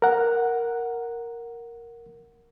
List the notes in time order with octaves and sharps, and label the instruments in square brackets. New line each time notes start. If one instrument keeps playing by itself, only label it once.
[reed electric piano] A#4 F#5